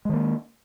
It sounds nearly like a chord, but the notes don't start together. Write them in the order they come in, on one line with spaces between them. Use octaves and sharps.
G#3 D#3 A#3